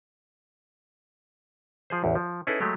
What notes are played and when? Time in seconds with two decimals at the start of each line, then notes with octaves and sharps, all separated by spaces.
1.90 F3 G#4 C5
2.04 A1 E2
2.15 F3
2.47 C#4 D#4 E4 G#4 A4 B4
2.60 F#3 G#3 A3 G4